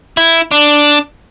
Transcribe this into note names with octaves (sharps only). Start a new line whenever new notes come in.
E4
D4